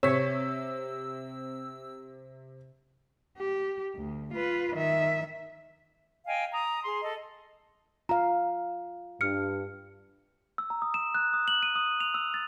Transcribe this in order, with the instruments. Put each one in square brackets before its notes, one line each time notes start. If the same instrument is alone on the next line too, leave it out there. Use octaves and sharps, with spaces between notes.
[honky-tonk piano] C3 B6 [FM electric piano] C4 E6 [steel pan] C#5
[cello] G4
D2
F4 B4
D#3 E5
[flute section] D#5 F5 G5 G#5
A#5 D#6
G#4 C6
A4 D#5
[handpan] F4 F5 [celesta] A#5
[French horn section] G2 [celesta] F6 C#7
[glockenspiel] E6
A#5
D#6
E7
F#6
D#6
F#7
D#7
D#6
F7
E6
A6